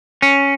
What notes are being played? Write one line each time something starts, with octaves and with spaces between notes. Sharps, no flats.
C#4